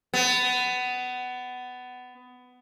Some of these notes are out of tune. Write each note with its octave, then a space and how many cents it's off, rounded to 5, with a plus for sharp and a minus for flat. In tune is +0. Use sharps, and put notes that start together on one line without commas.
B3 +20